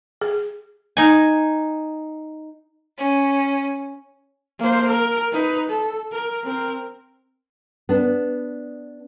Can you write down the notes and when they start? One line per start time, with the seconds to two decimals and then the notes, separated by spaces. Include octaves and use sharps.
0.21 G#4
0.97 D#4 G#5
2.98 C#4
4.59 A#3 C5
4.88 A#4
5.32 D#4 B4
5.69 A4
6.12 A#4
6.43 C4 A#4
7.89 B3 D4